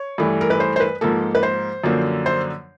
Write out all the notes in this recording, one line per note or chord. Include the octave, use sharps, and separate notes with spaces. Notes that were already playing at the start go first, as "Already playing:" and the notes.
Already playing: C#5
G2 E3 A3
A#4
B4
C5
C5
B4
G#2 F3 A#3 A4
B4
C5
F#2 D3 F3 A#3
C5